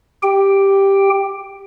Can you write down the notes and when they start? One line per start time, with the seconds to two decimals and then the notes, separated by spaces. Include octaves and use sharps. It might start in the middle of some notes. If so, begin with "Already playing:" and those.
0.23 G4 G5